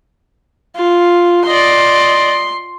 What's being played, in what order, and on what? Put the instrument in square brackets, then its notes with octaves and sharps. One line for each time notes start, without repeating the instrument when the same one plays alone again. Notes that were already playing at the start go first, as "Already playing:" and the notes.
[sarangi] F4
[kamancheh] D5 D#5 [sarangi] C6